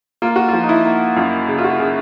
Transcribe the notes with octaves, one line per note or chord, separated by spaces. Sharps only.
A#3 F4
F#4
F3 F4
D#4
E4
A#3
F#2 F4
C#3
F4
F#4
C#3